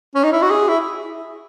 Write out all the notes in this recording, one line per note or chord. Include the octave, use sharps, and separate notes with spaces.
C#4
D#4
E4
F#4
G#4
E4